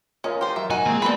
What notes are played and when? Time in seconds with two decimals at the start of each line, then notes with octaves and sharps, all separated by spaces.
0.24 C#4 F4 A#4 D#5
0.41 G4 C5 C6
0.56 F#3 E5
0.70 D#4 F#4 G#5
0.86 G#3 A#3 C4 G#4 G#5
1.02 A#3 B3 A4 B4 D5 G#5 B5 C6